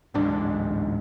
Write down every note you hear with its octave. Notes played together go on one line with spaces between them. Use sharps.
D1 A1 G#2 D4